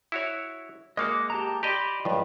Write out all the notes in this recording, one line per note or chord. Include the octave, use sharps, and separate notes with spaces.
E4 F#4 C#5
G#3 A#3 F#4 D#5 D6
G4 A5 A#5
G4 D5 D#5 B5 C6
C#2 G2 F3 F#3